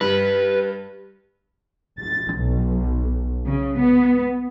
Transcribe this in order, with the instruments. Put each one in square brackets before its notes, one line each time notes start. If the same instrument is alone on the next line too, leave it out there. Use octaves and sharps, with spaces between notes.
[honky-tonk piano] G2 [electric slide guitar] B4
[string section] A6
B1
C#3
B3